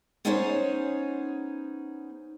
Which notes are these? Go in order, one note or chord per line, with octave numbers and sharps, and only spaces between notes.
B3 C#4 D#4 G#4 C5 C#5